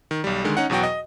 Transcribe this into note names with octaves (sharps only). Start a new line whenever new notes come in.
D#3
B1 G3
D3 D#3 G#3
C#4 D#4 F#5
E2 B2 F#3 F#4 G5
D#5